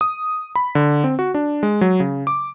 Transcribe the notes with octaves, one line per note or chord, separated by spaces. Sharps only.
D#6
B5
D3
C4
F#4
D4
G#3
F#3
C#3
D6